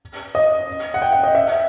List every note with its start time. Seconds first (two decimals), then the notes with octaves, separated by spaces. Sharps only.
0.35 D#5
0.94 F#5
1.02 G5
1.12 F#5
1.23 D#5
1.35 E5